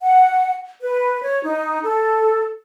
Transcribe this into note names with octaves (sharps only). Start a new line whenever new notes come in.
F#5
B4
C#5
D#4
A4